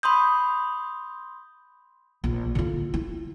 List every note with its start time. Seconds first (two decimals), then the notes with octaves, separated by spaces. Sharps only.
0.03 B5 C6 D#6 G6
2.24 A#1
2.55 D3 F4
2.94 E4